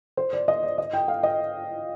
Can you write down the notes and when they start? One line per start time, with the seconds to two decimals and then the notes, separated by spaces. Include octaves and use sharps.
0.17 C5
0.33 D5
0.48 D#5
0.63 D5
0.78 D#5
0.93 G5
1.08 F5
1.23 D#5